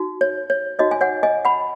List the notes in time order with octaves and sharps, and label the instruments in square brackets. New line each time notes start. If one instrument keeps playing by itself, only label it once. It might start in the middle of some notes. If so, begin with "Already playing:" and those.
Already playing: [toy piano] D#4 F#4
C#5
C#5
D#4 F#4 C#5 D#5
G#5
C#5 F#5
D#5 G#5
F#5 B5